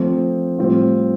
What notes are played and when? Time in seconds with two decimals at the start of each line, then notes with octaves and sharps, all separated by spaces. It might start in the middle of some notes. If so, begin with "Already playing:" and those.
Already playing: F3 A3 C4
0.59 A2 G3 C4 F4